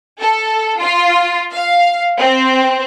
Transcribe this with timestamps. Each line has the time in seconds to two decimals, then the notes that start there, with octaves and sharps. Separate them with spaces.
0.22 A4
0.81 F4
1.54 F5
2.19 C4